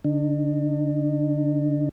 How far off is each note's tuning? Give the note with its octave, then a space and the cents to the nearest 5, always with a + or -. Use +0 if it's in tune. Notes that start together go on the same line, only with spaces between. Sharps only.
D3 -15 D#4 -45